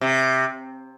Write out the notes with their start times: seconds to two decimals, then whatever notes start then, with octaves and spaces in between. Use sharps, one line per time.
0.01 C3